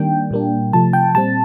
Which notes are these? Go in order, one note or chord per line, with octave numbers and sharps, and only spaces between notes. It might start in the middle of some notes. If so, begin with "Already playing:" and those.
Already playing: D#3 G3 A#3 D4 G5
A#2 G3 A#3 D4
C3 F3 A3 A5
G5
A#2 G3 C4 A5